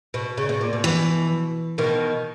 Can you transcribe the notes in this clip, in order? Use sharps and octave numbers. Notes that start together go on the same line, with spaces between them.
B2
C#3
B2
A#2
B2
E3
B2 D#3